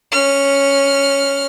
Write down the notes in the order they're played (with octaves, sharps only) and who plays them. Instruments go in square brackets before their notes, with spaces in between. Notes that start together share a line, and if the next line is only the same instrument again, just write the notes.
[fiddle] C#4 F6